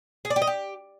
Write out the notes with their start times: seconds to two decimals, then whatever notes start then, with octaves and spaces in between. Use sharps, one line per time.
0.25 G#4
0.30 D5
0.36 G4
0.42 D#5
0.47 G4